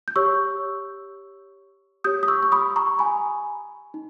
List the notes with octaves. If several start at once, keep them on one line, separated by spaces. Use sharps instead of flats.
G6
G4 C#5 C#6 E6
G4 C#5 D#6 G6
D#6
C#6 E6
C#6
B5 D#6
A#5 C#6
G#5 B5
D#4